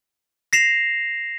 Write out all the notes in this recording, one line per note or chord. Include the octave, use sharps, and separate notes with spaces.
A#6 C7 E7 F7